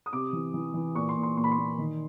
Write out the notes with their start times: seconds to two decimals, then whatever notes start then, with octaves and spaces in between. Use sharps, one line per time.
0.06 D#6
0.13 C3 D6
0.33 E3
0.54 E3
0.74 E3
0.95 A#2 C#6
1.09 C6
1.16 A#2
1.23 C6
1.37 A#2 C6
1.44 B5
1.51 C6
1.58 A#2
1.78 D#3